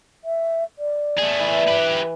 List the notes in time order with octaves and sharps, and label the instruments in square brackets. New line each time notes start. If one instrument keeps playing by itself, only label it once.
[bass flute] E5
D5
[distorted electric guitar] A3 G#4
[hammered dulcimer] E3
[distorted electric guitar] G4 B4